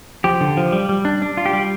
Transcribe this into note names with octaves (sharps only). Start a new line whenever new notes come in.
F3 G4
D3
F3
G3
G3
D4
D4
F4
G4
G3